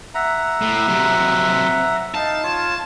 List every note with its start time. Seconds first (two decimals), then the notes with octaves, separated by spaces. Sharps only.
0.15 E5 F#5 A#5
0.62 A2
0.88 C3 F#3
2.15 D#4 F5 A5
2.43 F4 C#5